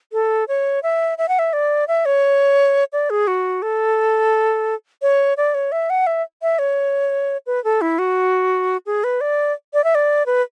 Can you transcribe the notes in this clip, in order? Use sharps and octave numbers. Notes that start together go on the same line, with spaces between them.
A4
C#5
E5
E5
F#5
E5
D5
E5
C#5
D5
G#4
F#4
A4
C#5
D5
C#5
E5
F#5
E5
E5
C#5
B4
A4
E4
F#4
G#4
B4
D5
D5
E5
D5
B4